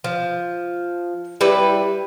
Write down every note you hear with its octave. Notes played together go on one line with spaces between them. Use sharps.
F3
G3 E4 B4 D5